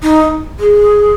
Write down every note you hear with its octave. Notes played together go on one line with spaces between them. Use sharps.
D#4
G#4